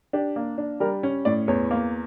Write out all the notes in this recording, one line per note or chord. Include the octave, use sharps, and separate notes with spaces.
D4 G4
A#3
D4
G3 A#4
C#4 C#5
A2 D5
E2 C#5
A#3